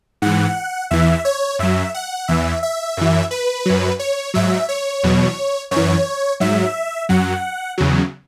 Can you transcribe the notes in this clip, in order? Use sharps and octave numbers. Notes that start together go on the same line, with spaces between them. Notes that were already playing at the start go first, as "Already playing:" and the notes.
G#2 E3 F#5
E2 E3 E5
C#5
F#2 F#3 E5
F#5
E2 E3 E5
E5
F#2 E3
B4
F#2 F#3
C#5
G#2 F#3 E5
C#5
E2 B2 F#3
F#2 C#5
E3
G#2 F#3 E5
F#2 F#3 F#5
E2 C#3 F#3